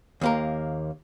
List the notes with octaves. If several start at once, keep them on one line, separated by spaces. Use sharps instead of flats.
D#2 A#3 A#4